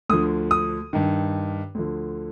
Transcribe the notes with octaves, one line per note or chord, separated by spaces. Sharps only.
D2 D3 F3 D#6
D#6
G2 D#3
D2 D3 F3